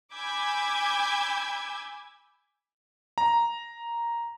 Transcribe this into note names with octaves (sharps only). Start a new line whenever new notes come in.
G#5 B5 D6 E6 G6 G#6
A#5